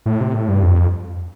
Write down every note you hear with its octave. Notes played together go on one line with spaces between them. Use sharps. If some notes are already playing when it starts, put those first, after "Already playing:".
A2
C3
A2
G2
F2